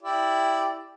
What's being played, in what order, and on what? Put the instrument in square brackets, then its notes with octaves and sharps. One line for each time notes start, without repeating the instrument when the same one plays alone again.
[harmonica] E4 G4 D5